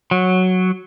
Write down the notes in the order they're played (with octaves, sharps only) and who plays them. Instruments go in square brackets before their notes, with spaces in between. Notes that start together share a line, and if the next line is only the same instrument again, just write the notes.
[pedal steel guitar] F#3